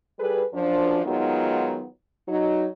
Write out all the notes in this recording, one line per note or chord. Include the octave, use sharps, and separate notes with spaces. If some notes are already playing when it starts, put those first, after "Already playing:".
G3 G#4 A4 B4
F#2 F3 D4
D#3 F#3 G#3 B3 D#4 F4
F#3 D#4